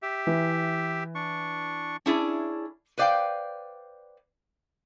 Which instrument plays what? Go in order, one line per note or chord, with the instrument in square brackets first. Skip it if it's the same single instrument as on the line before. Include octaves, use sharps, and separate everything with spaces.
[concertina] G4 E5
[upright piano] E3
[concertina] D4 C#6
[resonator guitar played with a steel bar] C#4 D4 E4 G#4 D5
B4 C5 D5 F5 G5